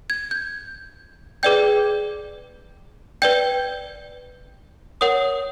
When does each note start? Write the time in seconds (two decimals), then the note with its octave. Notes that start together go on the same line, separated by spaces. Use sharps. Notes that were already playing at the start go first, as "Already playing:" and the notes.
0.10 G#6
0.31 G6
1.43 G#4 B4 D5 G5 G6
3.22 B4 D5 G5 G6
5.01 A#4 C#5 F#5 D#6